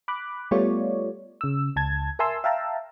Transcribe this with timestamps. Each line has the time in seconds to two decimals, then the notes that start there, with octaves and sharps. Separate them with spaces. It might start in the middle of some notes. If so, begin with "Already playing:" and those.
0.08 B5 D6 F#6
0.51 G3 A3 B3 F4 C#5 D5
1.41 C#3 E6
1.76 C#2 A5 G#6
2.19 A#4 E5 G#5 A5 C6 E6
2.44 E5 F5 G5 A5 A#5 E6